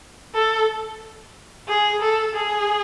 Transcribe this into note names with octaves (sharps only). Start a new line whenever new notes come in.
A4
G#4
A4
G#4